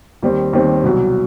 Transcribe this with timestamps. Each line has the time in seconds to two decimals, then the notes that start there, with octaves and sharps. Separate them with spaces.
0.22 D#2 D#3 G3 C4
0.53 D#2 D#3 G3 C4
0.84 C2 B2 F#3